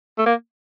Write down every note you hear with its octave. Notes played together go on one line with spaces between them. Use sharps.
A3
A#3